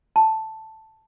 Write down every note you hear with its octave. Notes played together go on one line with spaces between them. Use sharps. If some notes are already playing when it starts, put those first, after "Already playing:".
A5